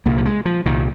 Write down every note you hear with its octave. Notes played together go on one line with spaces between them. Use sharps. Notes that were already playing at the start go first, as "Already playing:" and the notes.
C2 A#2 A#3
F3
G#3
F3
C2 A#2 D#3